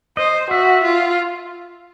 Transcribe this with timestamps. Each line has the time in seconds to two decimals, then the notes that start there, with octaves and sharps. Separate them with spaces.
0.17 C5 D#5
0.51 F#4 E5
0.84 F4